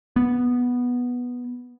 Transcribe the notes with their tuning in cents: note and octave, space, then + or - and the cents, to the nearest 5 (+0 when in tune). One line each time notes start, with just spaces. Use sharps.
B3 -5